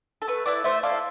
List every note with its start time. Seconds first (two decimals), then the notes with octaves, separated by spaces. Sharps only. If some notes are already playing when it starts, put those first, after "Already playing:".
0.22 A4
0.28 A3 B4
0.46 E4 A4 B4 D5
0.64 A3 C5 E5
0.83 E4 A4 D5 F5